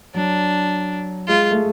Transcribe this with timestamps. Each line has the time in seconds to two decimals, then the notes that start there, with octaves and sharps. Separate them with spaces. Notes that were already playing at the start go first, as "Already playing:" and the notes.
0.14 F#3 D4
1.28 G#3 F4
1.51 A3
1.56 G#3